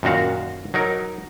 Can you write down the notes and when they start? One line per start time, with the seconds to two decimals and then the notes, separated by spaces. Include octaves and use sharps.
0.03 F#2 A#2 D#3 F#4 F5
0.74 F#3 D#4 A#4